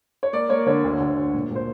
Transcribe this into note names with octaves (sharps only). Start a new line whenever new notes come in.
C#5
A#3 D5
A#3 C#5
D3 C#5
D2
D2
D2
A#2
A#2 C5